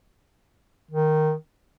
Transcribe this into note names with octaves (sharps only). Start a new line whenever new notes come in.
D#3